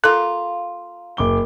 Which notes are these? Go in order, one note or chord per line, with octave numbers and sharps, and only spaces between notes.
A#3 F4 A4
F#1 D6 G7